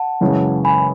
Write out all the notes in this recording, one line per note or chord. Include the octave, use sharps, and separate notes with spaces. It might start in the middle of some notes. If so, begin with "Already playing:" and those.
Already playing: F#5 A5
F#2 C#3 E3 G#3 C#4
G#5 B5